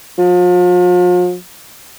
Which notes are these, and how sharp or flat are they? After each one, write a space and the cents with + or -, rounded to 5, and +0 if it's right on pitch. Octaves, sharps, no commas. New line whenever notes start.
F3 +40